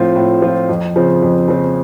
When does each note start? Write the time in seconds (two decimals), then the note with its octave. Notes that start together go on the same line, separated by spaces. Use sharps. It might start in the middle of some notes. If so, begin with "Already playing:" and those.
Already playing: A2 F3 C4 F4
0.16 A2
0.42 F3 C4 F4
0.69 F2
0.96 C#3 F3 C4
1.23 F2
1.48 C#3 F3 C4